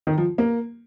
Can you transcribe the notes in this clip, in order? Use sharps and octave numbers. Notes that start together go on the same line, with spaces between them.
D#3
F3
A#3